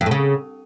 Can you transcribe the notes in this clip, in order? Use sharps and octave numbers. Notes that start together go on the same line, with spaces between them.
F2
A2
C#3